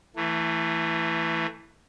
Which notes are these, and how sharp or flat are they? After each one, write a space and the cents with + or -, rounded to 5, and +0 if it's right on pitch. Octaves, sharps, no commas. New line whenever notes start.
E3 +0 A3 +20